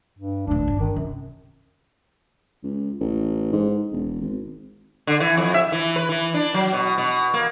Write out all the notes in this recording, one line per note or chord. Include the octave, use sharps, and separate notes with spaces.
G2
D2 A2 D4
G1
D#3
F#2 C3
C#2
A1
G#2
E1
G#1
D3
E3
F2
E5
E3
B4
E3
D4
F#3
B2
B2
A#3